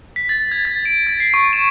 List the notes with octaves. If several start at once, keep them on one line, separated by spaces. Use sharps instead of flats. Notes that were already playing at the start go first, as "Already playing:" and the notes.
B6
A6
G#6
A6
D7
A6
C7
C#6
E7